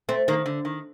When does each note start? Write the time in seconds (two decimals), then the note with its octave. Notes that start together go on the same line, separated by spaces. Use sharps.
0.09 A3 C4
0.28 D#3 A#3
0.46 D3
0.65 D#3